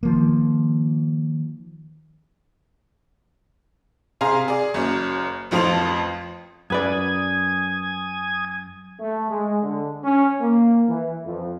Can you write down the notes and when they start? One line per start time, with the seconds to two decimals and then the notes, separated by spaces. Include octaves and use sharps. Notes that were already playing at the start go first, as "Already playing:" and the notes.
0.03 D#3 F3 A#3
4.21 C3 G#4 F5 A#5 C6
4.48 G#4 D5
4.74 F#1 F#2
5.51 A1 F2 F3 C5 A5 F7
6.70 F#2 B4 D5 G#5 D#6 G#6
9.00 A3
9.30 G#3
9.63 D3
10.04 C#4
10.40 A#3
10.88 E3
11.25 F2